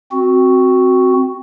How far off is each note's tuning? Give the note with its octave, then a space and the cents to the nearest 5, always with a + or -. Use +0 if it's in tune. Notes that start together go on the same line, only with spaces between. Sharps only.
C4 +0 F#4 +0